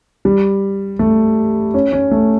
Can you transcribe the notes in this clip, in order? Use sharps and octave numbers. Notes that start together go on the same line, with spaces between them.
G3
A3
C#4
C#4
A3